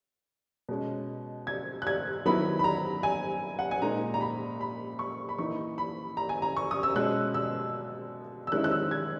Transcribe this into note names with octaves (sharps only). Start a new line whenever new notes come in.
B2 G#3 C#4
G#6
F#6
G#6
D#3 F#3 B3 E4 B5
B5
A#5
G#5
F#5
G#5
A#2 G#3 D#4 A#5
A#5
B5
B5
C#6
B5
E3 A#3 D#4 C#6
B5
A#5
G#5
A#5
C#6
D#6
E6
B2 G#3 C#4 F#6
E6
E6
D#3 G#3 C#4 E4 F#6
F#6
E6
G#6